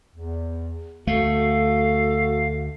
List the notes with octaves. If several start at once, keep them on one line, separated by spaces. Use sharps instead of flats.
E2
D2 A3 F#4 A4 F5